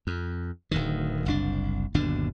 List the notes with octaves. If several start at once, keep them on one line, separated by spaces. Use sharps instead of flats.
F2
D1 D2 D#3
F#1 C2 D4
G1 D#2 B2 D4